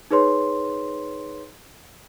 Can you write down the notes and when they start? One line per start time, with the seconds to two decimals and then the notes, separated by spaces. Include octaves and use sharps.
0.11 D#4 G#4 B4 C#5 C6